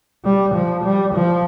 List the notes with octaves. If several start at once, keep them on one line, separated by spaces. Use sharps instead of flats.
G3
F3
G3
F3